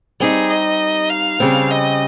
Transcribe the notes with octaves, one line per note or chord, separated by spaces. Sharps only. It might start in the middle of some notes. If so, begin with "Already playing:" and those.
G3 C4 D#4 G#4
D#5
F5
C#3 G3 C4
D#5